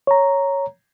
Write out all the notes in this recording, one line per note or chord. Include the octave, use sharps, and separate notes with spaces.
C#5 A#5